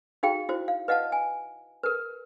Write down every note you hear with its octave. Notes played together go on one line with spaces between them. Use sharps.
D#4 F#4 G#4 F5 G5
E4 F#4 C5
F5
B4 D#5 F5 F#5 A5
G#5
A#4 B4